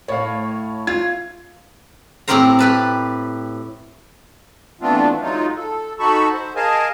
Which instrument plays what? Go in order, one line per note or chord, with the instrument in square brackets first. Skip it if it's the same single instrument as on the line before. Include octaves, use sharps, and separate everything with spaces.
[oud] A2 [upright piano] C#5 F5
[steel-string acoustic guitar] F4 [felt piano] G#6
[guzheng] A2 C4 G4 A#4 C5 A#5
G4 B4 A5
[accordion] E3 A3 B3 C4 D4 F4
F#3 G#3 D#4 F4
A4
D#4 F#4 A4 A5 B5 C#6
C5
G#4 A#4 D#5 F5 G#5 A5